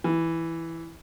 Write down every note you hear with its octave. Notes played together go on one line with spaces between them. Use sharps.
E3